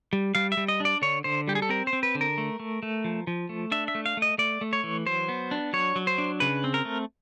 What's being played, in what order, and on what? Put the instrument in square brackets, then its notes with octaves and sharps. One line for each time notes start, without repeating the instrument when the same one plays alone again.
[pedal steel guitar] G3
G3 F5
E5
G3
D#5
D4 D5
D3 C#5
D3 C5
G3 G4
G#4
A4
C4 A#4
C5
C4
B4
D3
A#4
A3
A3
A3
F3
F3
A3
D4 E5
E5
A3
F5
A3
D#5
A3 D5
A3
C#5
E3
F#3 C5
B3
D4
F#3 C#5
F#3
C5
D4
C#3 B4
C4
A#4
A3